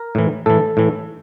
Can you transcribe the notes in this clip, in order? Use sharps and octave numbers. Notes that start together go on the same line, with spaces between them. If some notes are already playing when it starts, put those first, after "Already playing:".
Already playing: A#4
A2 E3
A2 E3 A4
A2 E3